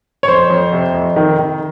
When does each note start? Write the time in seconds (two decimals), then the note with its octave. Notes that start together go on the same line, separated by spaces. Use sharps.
0.23 C#5
0.28 F2 C5
0.50 F2
0.73 C3
0.94 F2
1.16 D#3
1.39 D#3